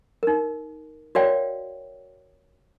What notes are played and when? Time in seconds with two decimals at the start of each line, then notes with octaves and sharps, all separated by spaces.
0.23 D#4 A#4
1.15 F#4 A#4 C#5 D5 F5 G5